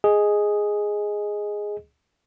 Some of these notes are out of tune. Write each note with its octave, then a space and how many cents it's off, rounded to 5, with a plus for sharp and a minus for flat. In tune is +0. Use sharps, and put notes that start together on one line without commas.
G#4 +0 D#5 +0